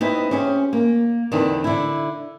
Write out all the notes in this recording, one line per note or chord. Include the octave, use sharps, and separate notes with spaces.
B3 D#4 E4 G4 C5
C#4 G4 G#4 C5
A#3
E2 D3 D#3 B3 C4 D#4
D3 E4